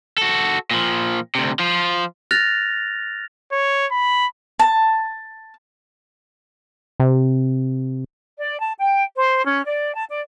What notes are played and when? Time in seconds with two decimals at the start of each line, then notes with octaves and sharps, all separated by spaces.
0.18 F#4 A4
0.71 A#2 F3
1.35 D2 C3
1.59 F3 F4
2.31 F6 F#6 A6 A#6 F7
3.52 C#5
3.91 B5
4.59 A5
7.00 C3
8.39 D5
8.59 A5
8.78 G5
9.15 C5
9.45 C#4
9.65 D5
9.94 A5
10.08 D5